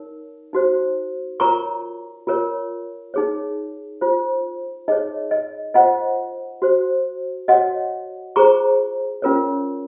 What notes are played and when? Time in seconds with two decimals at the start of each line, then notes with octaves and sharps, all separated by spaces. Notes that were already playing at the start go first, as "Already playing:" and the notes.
Already playing: D#4 A#4 C#5
0.53 D#4 F#4 C5
1.40 F4 A#4 C#5 A#5 C#6
2.27 F4 A#4 C#5
3.14 D#4 G#4 C#5
4.01 F4 C5
4.88 D#4 G#4 C#5 D#5
5.31 D#5
5.74 F4 C5 D#5 F#5
6.62 F#4 C5
7.48 F#4 C#5 D#5 F#5
8.36 F4 G#4 C5 A#5 C#6
9.22 C#4 F4 A#4 C#5